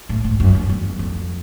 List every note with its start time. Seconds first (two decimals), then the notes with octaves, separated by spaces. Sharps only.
0.09 A2
0.24 G#2
0.40 F#2
0.55 F2
0.69 E2
0.99 F2